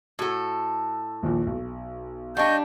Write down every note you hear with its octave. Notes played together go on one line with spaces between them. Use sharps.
A2 F#4 A4
A#1 D#2 A#2
B1
G3 D4 D#5 F5 G5 A5 C#6 G6